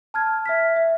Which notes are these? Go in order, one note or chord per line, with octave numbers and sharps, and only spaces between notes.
A5 F6 G#6
E5 F6 B6
E5